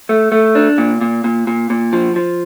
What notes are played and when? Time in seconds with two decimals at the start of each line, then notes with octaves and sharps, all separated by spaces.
0.09 A3
0.32 A3
0.55 D4
0.78 A#2
1.01 A#2
1.24 A#2
1.47 A#2
1.70 A#2
1.93 F3
2.16 F3